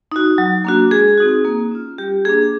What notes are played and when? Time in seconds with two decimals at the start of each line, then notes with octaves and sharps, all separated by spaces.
0.12 D#4 F#4
0.38 F#3
0.65 A#3 D4 F#4
0.91 G#3 G#4
1.18 C4 D#4 F#4
1.45 A#3
1.71 C#4 F4
1.98 G3 G4
2.25 A#3 D4 G#4